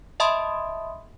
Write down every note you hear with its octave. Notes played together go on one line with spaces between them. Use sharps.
D#5 E5 A5 B5 C6 D#6